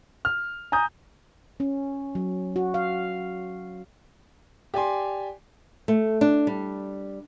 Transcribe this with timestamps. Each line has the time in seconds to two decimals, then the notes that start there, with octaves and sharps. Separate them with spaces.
0.25 F6
0.72 G#5 A#5 D#6 G6
1.60 C#4
2.15 F#3
2.56 F#4
2.74 F5
4.74 G4 D5 G#5 C6
5.88 A3
6.21 D4
6.47 G3